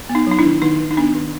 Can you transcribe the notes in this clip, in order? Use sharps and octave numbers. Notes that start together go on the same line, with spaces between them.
B3
D#4
F#3 D#4
D4 E4
D#3
D#3 D#4
D#3
D#4
B3 D4
D#3